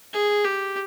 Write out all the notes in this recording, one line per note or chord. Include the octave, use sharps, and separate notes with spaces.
G#4
G4